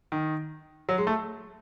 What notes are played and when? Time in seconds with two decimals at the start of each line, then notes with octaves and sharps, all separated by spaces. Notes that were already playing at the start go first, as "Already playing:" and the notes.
0.12 D#3
0.89 F#3
0.98 G#3
1.07 A3